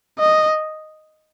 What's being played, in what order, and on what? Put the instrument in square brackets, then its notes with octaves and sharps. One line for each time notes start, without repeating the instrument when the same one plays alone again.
[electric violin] D#5